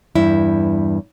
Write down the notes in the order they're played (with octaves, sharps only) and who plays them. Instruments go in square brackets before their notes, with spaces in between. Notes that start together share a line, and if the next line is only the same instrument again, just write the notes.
[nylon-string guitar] E2 G2 E4